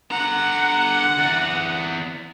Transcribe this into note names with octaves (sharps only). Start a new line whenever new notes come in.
D3 F#5 A#5
E3 D5